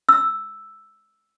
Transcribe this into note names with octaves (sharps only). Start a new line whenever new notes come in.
E6